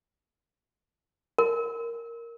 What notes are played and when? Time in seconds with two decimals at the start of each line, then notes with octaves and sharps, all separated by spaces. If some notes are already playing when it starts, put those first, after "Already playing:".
1.38 A#4